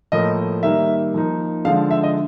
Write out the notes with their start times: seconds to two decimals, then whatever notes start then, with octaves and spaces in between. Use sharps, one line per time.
0.12 A2 F3 A#3 D#5
0.63 D#3 G3 A#3 E5
1.14 F3 A#3 D#4
1.65 D3 F3 G#3 F5
1.91 E5
2.03 D#5